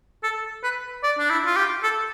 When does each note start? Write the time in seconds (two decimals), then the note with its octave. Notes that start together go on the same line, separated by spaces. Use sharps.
0.23 A4
0.63 B4
1.03 D5
1.19 D4
1.30 E4
1.46 F4
1.56 G4
1.83 A4